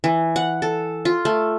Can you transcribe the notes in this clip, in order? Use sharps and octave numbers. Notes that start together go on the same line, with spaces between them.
E3
F#5
A4
F4
A3